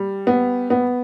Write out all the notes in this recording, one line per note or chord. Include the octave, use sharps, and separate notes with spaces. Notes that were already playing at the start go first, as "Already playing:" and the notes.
Already playing: G3
B3
B3